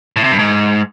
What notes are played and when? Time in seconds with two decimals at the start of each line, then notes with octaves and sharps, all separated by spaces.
0.16 A2
0.24 C3
0.31 G2
0.39 G#2